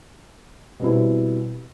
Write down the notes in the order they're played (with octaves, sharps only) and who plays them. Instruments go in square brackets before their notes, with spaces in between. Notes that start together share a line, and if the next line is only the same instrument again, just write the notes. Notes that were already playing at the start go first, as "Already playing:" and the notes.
[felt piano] B2 G3 C4 E4